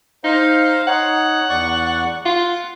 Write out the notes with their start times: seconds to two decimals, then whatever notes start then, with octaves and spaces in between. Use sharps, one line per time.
0.24 D#4 C5 F5
0.87 D#4 C#5 F#5
1.49 E2 D5 C#6
2.25 F4 F#5